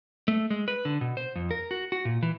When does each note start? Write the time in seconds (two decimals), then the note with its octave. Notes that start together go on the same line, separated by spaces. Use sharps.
0.28 A3
0.50 G#3
0.68 B4
0.85 D3
1.01 B2
1.17 C5
1.36 F2
1.51 A#4
1.71 F#4
1.92 F#4
2.05 A#2
2.23 E3